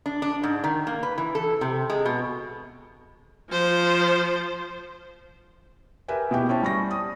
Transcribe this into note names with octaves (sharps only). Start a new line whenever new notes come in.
D4
D4
G#2
D#3
A#3
B4
E3
A4
C3
G#3
B2
F3 C5
G4 A#4 B4 E5 G#5
B2 E4 G4
C#4 E4 C5 A5
G3 C#6 A#6
D#6